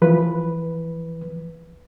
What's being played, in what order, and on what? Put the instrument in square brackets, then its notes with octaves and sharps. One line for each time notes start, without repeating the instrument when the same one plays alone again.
[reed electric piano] E3 F3 B4